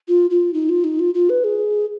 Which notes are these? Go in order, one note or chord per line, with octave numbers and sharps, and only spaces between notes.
F4
F4
D#4
F4
D#4
F4
F4
B4
G#4